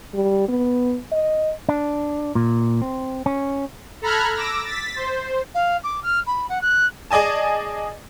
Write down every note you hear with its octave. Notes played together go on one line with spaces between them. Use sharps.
G3
B3
D#5
D4
A#2
C4
C#4
A4 A#5 B5 F6 F#6 G#6
D6 E6 A#6
A6 B6
C5
F5
D6
F6
B5
F#5
F#6
G#4 D5 D#5 G#5 A5